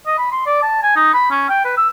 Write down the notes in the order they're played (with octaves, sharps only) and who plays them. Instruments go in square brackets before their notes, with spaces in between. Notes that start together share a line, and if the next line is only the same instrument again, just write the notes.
[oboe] D#5
B5
C6
D5
A5
G#5
D#4
B5
C#4
G5
B4
E6